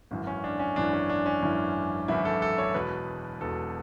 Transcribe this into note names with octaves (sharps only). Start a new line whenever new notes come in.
G#1 F#2 E3
C#4
D4
C#4
G#1 F#2 E3 D4
C#4
D4
C#4
G#1 F#2 E3
G#1 F#2 E3 E4
A4
A4
C#5
E1 E2 B2 B4
E1 E2 B2 A4